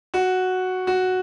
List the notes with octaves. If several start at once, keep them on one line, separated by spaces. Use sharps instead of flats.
F#4
F#4